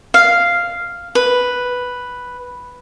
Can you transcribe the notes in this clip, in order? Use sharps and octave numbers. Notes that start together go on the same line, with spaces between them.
F5
B4